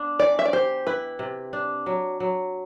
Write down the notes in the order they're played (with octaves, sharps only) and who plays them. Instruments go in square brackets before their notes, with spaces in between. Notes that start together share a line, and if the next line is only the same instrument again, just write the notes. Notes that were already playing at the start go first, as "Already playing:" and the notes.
Already playing: [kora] B3 D4
[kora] E3 [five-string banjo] D5
[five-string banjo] E5
D5
[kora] G4 [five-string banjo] C5
[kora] E4 [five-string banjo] B4
[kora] C3
D4
F#3
F#3